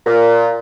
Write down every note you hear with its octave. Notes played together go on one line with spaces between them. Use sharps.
A#2